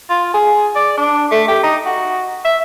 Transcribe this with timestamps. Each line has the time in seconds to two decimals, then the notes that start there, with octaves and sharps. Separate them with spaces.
0.10 F4
0.34 G#4
0.76 D5
0.97 D4
1.31 A3
1.48 G4
1.63 D#4
1.86 F#4
2.45 E5